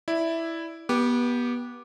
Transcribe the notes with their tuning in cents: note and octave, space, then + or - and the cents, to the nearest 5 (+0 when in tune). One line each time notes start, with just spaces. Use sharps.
E4 +0 D5 +0
B3 -25 G4 +0 D6 +0